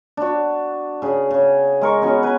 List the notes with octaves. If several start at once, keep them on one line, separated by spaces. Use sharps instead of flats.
D4 F#4
C#3 G#4
C#3
G#3 A#4 C#6
B3 C#4 F#4
B4 G#5